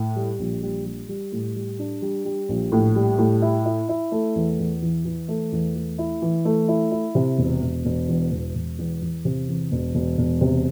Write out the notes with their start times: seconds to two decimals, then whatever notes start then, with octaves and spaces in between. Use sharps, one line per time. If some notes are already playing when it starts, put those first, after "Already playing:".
Already playing: A2
0.16 G3
0.39 A#1
0.63 G3
0.86 G3
1.09 G3
1.32 A2
1.56 G3
1.79 D4
2.02 G3
2.25 G3
2.49 A#1
2.72 A2
2.96 G3
3.18 A2
3.42 E4
3.65 E4
3.89 E4
4.12 A3
4.35 E2
4.59 E2
4.82 E3
5.05 E3
5.28 A3
5.52 E2
5.75 A3
5.98 E4
6.22 E3
6.45 A3
6.68 E4
6.91 E4
7.15 C3
7.38 E1
7.62 E1
7.85 E1
8.08 E2
8.32 E1
8.55 E1
8.78 E2
9.02 E2
9.25 C3
9.48 E2
9.72 E1
9.95 E1
10.18 E1
10.41 C3